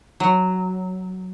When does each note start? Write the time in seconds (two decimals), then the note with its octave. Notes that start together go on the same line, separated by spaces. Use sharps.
0.20 F#3